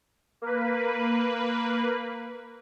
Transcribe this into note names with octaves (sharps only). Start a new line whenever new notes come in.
A#3 B4